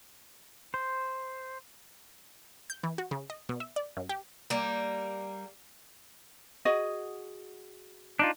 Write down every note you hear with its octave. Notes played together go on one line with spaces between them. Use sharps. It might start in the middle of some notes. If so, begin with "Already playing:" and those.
C5
G6
E3
F#4
C#3
D#5
B2
E5
D5
F#2
G4
G3 A#3
F#4 G#4 D#5
D4 D#4 F4